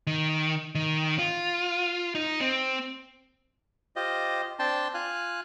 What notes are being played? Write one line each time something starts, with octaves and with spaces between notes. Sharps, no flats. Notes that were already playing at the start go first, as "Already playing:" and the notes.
D#3
D#3
F4
D#4
C4
F4 G4 C5 D#5
C4 D4 G5 A5 C6
F4 F5 G#5 F#6